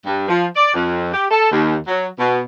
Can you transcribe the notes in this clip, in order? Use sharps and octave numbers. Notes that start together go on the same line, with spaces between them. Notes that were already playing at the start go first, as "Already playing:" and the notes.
G2
F3
D5
F2
G4
A4
D#2
F#3
B2